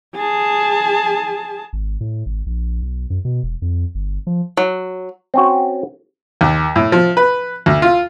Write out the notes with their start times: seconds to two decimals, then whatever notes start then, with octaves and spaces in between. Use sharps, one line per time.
0.15 G#4 A5
1.73 G#1
2.01 A2
2.26 G#1
2.46 A#1
2.82 B1
3.10 F#2
3.25 B2
3.43 E1
3.62 F2
3.95 G1
4.27 F3
4.57 F#3
5.34 C4 C#4 F#4
6.41 D#2
6.76 A2
6.92 F3
7.17 B4
7.66 D2
7.82 F4